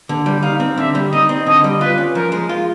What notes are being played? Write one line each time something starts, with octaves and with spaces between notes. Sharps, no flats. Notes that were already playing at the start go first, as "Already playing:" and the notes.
D3
G3
D#4 F5
C4
D3 E5
G3
D#4 D#5
C4
D3 D#5
G3
F4 B4
C#4
F3 A#4
G#3
F4